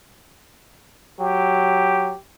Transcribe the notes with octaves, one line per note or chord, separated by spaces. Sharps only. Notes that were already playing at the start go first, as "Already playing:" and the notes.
F#3 G4